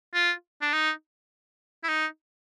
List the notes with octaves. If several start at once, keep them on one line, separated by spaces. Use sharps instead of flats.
F4
D4
D#4
E4
D#4